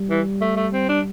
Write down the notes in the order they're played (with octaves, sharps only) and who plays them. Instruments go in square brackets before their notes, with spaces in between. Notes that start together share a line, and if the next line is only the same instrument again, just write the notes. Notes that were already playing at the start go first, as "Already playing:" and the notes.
Already playing: [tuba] G3
[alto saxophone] E3
A3
A3
C4
D4